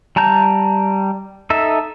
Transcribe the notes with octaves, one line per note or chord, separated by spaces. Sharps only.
G3 A5 A#5 G6
D#4 A4 E5